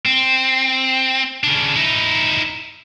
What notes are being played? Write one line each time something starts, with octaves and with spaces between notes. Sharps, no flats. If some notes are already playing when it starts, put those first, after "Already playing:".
C4
C#3 D4
D#4 E4